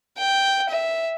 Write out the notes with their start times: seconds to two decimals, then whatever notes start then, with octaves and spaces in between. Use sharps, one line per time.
0.18 G5
0.69 E5